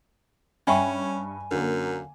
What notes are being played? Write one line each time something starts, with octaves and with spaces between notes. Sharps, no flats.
G2 C#4 E5 G5 G#5 B5 C#6
F#2 D3 A#3